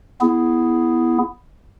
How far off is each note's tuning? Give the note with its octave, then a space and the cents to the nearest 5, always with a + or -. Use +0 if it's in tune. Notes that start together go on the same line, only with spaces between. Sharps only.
B3 +0 E4 +0 G#4 +0